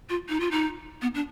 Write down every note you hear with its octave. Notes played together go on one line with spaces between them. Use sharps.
F4
D#4
F4
D#4
B3
D4